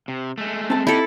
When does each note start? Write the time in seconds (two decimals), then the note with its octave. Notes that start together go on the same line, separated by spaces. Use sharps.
0.08 C3
0.38 G#3 A3
0.70 C4 A5
0.87 D#4 E4 G4 A4